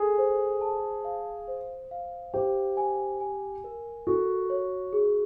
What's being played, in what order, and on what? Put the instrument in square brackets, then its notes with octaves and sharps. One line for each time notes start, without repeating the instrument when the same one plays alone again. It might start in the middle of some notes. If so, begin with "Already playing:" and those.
Already playing: [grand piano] G#4 [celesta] A4
[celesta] C5
A5
F5
C5
F5
[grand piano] G4 [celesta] C5
[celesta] G#5
G#5
A#4
[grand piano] F#4 [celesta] A4
[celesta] C#5
G#4